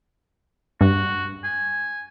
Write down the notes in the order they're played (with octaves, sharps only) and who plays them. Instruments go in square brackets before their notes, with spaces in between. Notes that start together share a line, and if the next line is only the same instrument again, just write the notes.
[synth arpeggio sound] G2 [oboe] F#4
[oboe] G#5